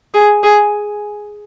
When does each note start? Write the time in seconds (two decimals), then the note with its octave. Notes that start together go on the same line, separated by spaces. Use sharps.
0.14 G#4
0.43 G#4